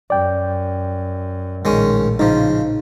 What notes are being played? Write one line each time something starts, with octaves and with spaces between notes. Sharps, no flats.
F#2 D5 G5
A#1 A2 D#3 G#3 C#4
C#3 F3 D#4